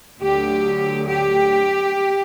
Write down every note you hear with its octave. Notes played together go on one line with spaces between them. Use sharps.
D2 D3 F#3 G4
G4